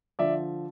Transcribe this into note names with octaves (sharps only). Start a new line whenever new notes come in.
D3 F3 D5 E5